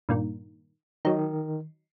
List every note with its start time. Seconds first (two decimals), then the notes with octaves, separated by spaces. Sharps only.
0.09 G2 A#2 D#3
1.05 D#3 F#3 D#4